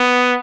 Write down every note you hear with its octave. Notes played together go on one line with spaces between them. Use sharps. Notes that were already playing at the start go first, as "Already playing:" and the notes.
Already playing: B3